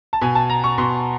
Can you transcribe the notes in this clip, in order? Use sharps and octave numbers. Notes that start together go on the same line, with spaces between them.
A5
B2 G#5
A5
A#5
C#6
B2 C6